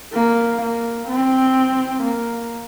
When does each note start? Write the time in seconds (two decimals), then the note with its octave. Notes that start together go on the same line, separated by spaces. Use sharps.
0.13 A#3
0.62 A#3
1.08 C4
2.03 A#3